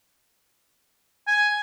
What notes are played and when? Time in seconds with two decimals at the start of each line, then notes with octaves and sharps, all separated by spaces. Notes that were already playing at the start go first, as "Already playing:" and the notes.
1.27 G#5